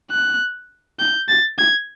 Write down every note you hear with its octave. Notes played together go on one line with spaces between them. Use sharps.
F#6
G6
A6
G#6